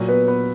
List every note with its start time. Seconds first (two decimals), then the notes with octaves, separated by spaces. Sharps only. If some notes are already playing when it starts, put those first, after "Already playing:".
Already playing: A#2 F#3
0.09 B3 B4
0.28 B3 B4